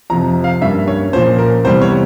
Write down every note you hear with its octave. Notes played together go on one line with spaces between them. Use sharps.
F2 C3 F3 A#5
F5
G2 G3 A#3 C#4 E5
C#5
A#2 F3 A#3 C#4 C5
A#4
E2 C3 G3 C5
C#5